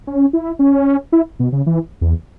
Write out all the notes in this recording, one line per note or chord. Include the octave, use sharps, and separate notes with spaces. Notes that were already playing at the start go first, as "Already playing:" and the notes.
C#4
E4
C#4
E4
B2
C#3
E3
E2